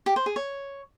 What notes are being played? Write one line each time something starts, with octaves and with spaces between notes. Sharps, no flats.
G4
C5
G#4
C#5